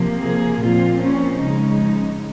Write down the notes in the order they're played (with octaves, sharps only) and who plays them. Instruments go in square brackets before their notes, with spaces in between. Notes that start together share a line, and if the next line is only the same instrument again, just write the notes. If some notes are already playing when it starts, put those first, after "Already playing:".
Already playing: [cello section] C3 F3 A#3
G#4
A#2 F3 C4 F4
C#4
C#3 F3 G#3 D#4